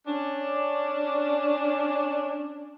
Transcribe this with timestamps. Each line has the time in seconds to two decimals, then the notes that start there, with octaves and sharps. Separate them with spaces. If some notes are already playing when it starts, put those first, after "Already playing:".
0.07 C#4 D4